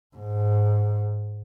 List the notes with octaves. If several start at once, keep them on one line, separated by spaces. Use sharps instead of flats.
G#2